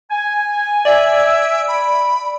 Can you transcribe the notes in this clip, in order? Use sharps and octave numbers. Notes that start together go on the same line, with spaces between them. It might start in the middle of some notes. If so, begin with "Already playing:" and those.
G#5
D5 E5
B5